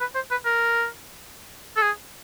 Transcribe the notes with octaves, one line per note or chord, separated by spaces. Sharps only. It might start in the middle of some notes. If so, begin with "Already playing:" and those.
B4
C5
B4
A#4
A4
G#4